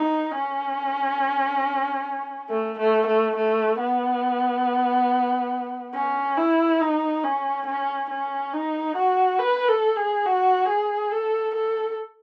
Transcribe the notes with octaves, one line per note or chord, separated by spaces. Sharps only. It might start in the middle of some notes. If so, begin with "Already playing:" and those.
Already playing: D#4
C#4
A3
A3
A3
A3
B3
C#4
E4
D#4
C#4
C#4
C#4
D#4
F#4
B4
A4
G#4
F#4
G#4
A4
A4